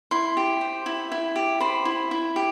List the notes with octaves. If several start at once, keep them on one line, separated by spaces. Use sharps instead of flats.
E4 C6
G4
C5
E4
E4
G4
C5 B5
E4
E4
G4